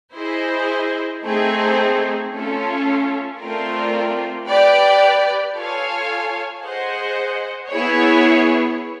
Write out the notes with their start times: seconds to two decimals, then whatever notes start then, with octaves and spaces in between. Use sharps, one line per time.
0.15 E4 G#4 C5 D#5
1.23 A3 C4 D#4 G#4
2.31 A3 C#4 F4 A4
3.39 A3 C4 F4 A#4 D5
4.47 G4 B4 D5 G5
5.55 F4 A4 C#5 F5 G#5
6.62 G#4 C5 D#5 F#5
7.70 B3 E4 G#4 C#5